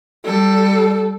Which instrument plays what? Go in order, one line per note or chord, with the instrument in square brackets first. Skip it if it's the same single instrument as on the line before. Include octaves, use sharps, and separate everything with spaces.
[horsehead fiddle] G3 A4